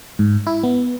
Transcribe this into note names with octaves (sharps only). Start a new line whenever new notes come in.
G#2
E4
B3